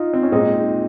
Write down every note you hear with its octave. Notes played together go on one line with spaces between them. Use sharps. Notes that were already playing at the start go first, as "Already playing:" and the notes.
Already playing: D#4 F4
C4
C#4
A#2 G#3 C4 D#4